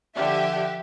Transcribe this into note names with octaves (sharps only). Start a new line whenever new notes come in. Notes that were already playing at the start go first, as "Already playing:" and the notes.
D3 F3 G4 E5